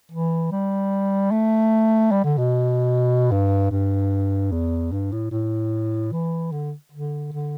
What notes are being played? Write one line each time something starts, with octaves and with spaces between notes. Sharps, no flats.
E3
G3
A3
G3
D3
B2
G2
G2
E2
G2
A2
A2
E3
D3
D3
D3